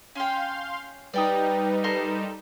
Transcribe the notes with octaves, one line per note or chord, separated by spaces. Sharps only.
C#4 F5 G5 C6
G3 D#4 B4 D5 G5 D#6
A4 A#4 C6